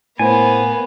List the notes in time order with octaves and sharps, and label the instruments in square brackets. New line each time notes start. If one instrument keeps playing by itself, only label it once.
[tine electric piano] A2 C5 [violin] A#3 B3 [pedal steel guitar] G#5